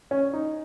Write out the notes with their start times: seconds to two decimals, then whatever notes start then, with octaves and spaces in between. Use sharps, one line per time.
0.11 C#4
0.33 D#4